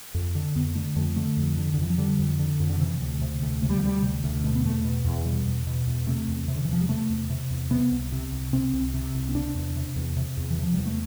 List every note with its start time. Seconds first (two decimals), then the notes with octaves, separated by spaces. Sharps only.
0.14 F2
0.35 D3
0.55 F2 B3
0.75 D3 A3
0.96 F2 A3
1.16 D3 A3
1.37 F2
1.58 D3
1.74 D3
1.78 F2 E3
1.90 F3
1.98 D3 G3
2.19 F2
2.39 D3
2.60 F2
2.69 D3
2.80 C3 E3
3.01 D2
3.22 C3
3.42 D2
3.62 C3 A3
3.70 G3
3.78 F3
3.83 D2 G3
4.03 C3
4.24 D2
4.44 B2 A3
4.55 B3
4.64 E2 A3
4.84 B2
5.05 E2
5.25 B2 G3
5.46 E2
5.67 B2
5.87 E2
6.07 C3 A3
6.28 E2
6.48 C3
6.56 D3
6.65 E3
6.68 E2 F3
6.81 G3
6.89 C3 A3
7.10 E2
7.30 C3
7.50 E2
7.71 C3 B3
7.91 C2
8.12 C3
8.32 C2
8.53 C3 C4
8.73 C2
8.94 C3
9.15 C2
9.29 C4
9.35 C3 D4
9.55 E2
9.76 C3
9.96 E2
10.17 C3
10.37 E2
10.50 E3
10.58 C3 F3
10.74 E2 G3
10.86 A3